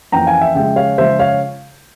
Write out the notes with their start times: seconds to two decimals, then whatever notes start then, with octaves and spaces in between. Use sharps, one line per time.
0.12 F2 E3 A#3 C#4 G5 A#5
0.27 F5 G#5
0.41 E5 G5
0.55 C#3 F3 G#3 E5 G5
0.76 C#5 F5
0.98 C#3 F3 G#3 C5 E5
1.19 C#5 F5